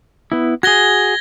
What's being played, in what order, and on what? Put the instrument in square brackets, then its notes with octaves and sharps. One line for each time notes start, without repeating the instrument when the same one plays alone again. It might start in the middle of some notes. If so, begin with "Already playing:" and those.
[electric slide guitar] B3 E4
[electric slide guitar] F#4 G#4 [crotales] G#6 A#6 G7